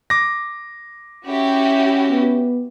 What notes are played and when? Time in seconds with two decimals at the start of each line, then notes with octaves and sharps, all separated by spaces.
0.10 D6 A#6
1.27 C#4 E4 F#4 G4
2.10 B3